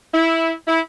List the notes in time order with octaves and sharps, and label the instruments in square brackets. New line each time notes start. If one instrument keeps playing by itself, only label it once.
[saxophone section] E4
E4